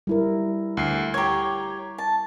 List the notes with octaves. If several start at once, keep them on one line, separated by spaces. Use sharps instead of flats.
G3 E4 A#4
D2 C7
G4 C#5 A#5 G#6
A5